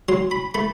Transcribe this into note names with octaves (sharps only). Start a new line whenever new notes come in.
F#3 C6
B5
A3 B5